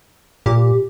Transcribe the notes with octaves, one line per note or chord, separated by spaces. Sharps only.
A#2 G4